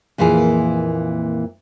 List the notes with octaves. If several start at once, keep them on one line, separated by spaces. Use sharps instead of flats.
F2 A#2 E3 A#3 G#4